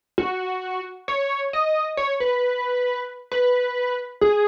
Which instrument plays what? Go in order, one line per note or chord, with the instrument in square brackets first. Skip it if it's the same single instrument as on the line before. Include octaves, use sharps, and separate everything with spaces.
[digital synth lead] F#4
C#5
D#5
C#5
B4
B4
G#4